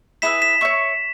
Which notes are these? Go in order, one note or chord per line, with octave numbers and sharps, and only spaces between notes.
E4 G#4 B4 E5 B6 E7
B6 E7
C#5 E5 C#6